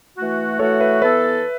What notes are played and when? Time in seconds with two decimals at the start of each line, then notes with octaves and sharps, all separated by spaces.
0.17 E3 A3 F#4
0.59 E3 A3 F#4 A4 C#5
0.80 B4 E5
1.02 E3 B3 A4 B4 E5